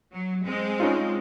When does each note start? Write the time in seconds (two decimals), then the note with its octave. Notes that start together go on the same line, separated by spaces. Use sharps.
0.12 F#3
0.43 G#3 C4
0.80 C#4 D#4 F4